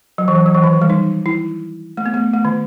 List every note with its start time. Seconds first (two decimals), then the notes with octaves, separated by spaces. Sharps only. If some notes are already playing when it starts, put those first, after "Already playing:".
0.18 F#3
0.28 E3
0.35 F#3
0.46 F#3
0.54 E3
0.64 D#3
0.73 E3
0.82 G3
0.90 D#4
1.26 E4
1.97 A3
2.06 B3
2.14 A3
2.33 A3
2.45 D#3